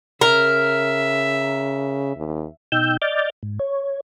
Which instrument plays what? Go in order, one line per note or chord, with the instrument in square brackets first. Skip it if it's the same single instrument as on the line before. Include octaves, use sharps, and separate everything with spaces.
[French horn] C#3 [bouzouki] A#4 [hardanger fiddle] E5
[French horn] D#2
[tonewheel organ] B2 D#4 G5 E6 G6
D5 D#5 D6 F6 G6 A6
G#2
C#5